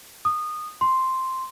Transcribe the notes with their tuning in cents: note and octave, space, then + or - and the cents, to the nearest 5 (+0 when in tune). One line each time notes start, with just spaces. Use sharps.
D#6 -20
C6 +0